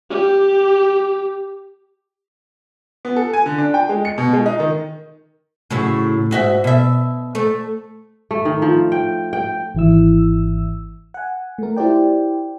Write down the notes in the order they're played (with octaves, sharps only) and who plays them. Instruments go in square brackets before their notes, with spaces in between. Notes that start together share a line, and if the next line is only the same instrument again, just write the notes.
[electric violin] G4
[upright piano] B3
A4
G#5
D3
D4
G5
G#3
C#7
B2
G#3
D#4
D#3
[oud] A2 C#3 F#3
G#2 F#4 E5
B2 E5
A3
[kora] A3
D#3
F3
G5
G5
[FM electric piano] G#1 E3 E4 E6
F#5 G#5
A3 A#4
E4 G4 C5 D5 G5